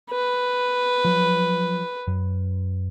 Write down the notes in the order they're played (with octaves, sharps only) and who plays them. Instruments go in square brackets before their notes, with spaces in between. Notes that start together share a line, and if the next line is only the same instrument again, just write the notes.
[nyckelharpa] B4
[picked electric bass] F3 F#3
F#2